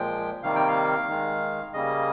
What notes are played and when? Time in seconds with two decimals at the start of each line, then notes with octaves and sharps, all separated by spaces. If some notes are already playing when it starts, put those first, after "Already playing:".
Already playing: A#2 F3 G#3 G5
0.43 C3 D#3 G3 A#3 F5
0.56 G5
0.68 F5
1.08 D#3 G#3
1.73 C#3 G3 A#3 D#5